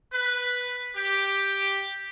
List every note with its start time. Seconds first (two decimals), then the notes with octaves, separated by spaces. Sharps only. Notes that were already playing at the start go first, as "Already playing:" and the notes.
0.14 B4
0.96 G4